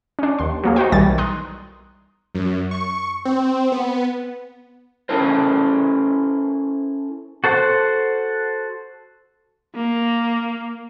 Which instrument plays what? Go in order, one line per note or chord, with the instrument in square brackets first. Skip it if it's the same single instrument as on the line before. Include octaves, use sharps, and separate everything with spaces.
[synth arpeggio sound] C#4 D4
D#2 C6
F#3 A#3 G#4
D#4 F#4 C5 G5
B1 D#3 E3 G3 G#6 A6
A#5 C6 D#6 F#6
[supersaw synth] F#2
C#6
C4
B3
[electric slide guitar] C#4 E4 A4 A#4 C5
[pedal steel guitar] F#4 A4 C5 F#5
[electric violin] A#3